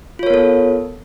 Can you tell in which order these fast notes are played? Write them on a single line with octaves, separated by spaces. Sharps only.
F4 C#5 A#4 B3 A4